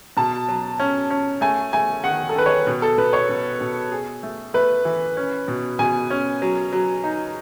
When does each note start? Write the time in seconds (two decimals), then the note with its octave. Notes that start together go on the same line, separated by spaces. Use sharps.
0.17 B2 A5
0.48 F#3
0.80 C#4
1.10 C#4
1.41 A3 G#5
1.73 A3 G#5
2.04 D#3 F#5
2.29 A4
2.35 D#3 B4
2.46 C#5
2.67 B2
2.82 A4
2.98 B2 B4
3.13 C#5
3.29 B2
3.61 B2
3.92 G#4
4.23 A3
4.54 A3 B4
4.85 E3
5.17 C#4
5.48 B2
5.79 B2 G#5
6.10 C#4
6.42 F#3
6.73 F#3
7.04 D#4